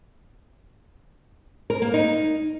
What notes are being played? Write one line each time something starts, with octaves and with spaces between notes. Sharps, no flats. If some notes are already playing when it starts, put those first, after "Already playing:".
A#4
A#3
D#4